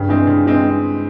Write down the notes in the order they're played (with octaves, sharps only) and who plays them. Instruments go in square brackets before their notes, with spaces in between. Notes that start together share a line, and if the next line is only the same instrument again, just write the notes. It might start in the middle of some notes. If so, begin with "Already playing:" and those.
Already playing: [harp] G2 [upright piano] C#3
[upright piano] E3 G#3 C4
C#3
E3 G#3 C4